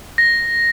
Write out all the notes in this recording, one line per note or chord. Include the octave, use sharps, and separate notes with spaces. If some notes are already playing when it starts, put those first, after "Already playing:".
A#6